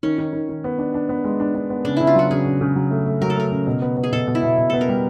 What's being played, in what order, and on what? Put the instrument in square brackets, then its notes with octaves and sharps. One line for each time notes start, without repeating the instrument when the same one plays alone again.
[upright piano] D#3 [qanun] C#4
[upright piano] D#3
D#3
D#3
B3
D4
D4
B3
G#3
D4
D4
B3
[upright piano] C#3 [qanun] D4
[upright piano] C#3 [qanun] E4
[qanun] F4
[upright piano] F#3 [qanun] F#4
[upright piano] C#3 [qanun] G#4
[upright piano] C#3
C#3
F#3
A3
A3
[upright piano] F#3 [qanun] A#4
[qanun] A4
[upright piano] A3 [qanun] A#4
[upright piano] C#3
B2
B3
B3
[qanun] G#4
[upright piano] B2 [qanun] A4
[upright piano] B2
[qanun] E4
[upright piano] B2
B2
[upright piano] B3 [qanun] A4
[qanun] A#4
[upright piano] G3